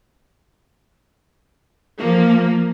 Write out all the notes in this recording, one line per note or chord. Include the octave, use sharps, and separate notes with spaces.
F3 A#3